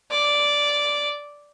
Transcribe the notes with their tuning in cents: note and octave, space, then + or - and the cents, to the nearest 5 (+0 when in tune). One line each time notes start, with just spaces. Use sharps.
D5 -5